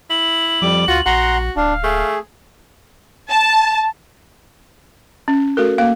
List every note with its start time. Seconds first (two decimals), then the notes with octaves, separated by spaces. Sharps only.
0.10 E4 F#7
0.62 F2 F3 G3 D6
0.88 D2 F4 F#4
1.06 A#1 F#4 F#5 A#5 C6
1.56 D1 D4 F5
1.84 A3 G#4
3.30 A5
5.28 C#4
5.57 A3 F#4 A4 A#4
5.78 A#3 F5